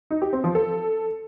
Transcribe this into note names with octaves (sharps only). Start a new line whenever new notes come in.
D#4
G4
C4
F3
A4